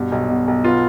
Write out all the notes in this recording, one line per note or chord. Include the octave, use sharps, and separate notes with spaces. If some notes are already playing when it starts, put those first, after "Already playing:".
Already playing: G2 B2
B1
B2
B1
B3 F4